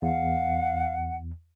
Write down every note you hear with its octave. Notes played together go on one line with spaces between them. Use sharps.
E2 F5 F#5